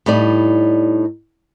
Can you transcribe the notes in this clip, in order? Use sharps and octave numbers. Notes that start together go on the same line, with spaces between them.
A2 G3 D#4 D5